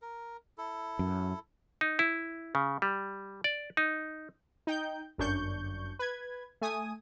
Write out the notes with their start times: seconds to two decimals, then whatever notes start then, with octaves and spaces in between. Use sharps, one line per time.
0.02 A#4
0.58 E4 A4
0.99 F#2
1.81 D#4
1.99 E4
2.55 C#3
2.82 G3
3.44 D5
3.77 D#4
4.67 D#4 G5 G6
5.18 G1 F#2 D4 C#6 G6
5.99 B4 G#6
6.61 A3 G#5 D#6 D#7